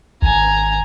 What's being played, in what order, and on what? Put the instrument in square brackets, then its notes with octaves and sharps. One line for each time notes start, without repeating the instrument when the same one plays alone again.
[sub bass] G#1 [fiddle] G#5 A#5